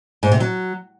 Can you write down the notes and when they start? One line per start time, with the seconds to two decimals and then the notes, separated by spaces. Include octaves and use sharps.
0.23 G#2
0.32 C3
0.40 F#3